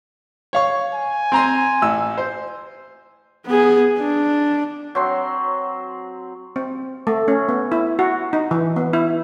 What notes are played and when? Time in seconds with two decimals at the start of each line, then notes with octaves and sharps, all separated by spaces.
0.53 C#5 F5 C#6
0.94 G#5
1.32 C4 A#5 C6
1.82 A1 E6
2.18 C5
3.46 B3 G#4
3.99 D4
4.95 F#3 C4 C6
6.56 C4
7.07 A3
7.28 C#4
7.49 B3
7.72 E4
7.99 F#4
8.33 D#4
8.51 E3
8.76 B3
8.93 E4